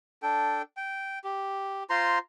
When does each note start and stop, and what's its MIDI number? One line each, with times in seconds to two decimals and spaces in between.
0.23 0.62 62
0.23 0.62 69
0.23 0.62 79
0.77 1.19 79
1.24 1.84 67
1.90 2.19 65
1.90 2.19 72
1.90 2.19 82
1.90 2.19 84